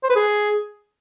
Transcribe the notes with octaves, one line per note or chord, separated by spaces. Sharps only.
C5
B4
G#4